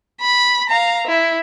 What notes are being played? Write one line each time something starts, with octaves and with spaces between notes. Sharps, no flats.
B5
F5 A#5
E4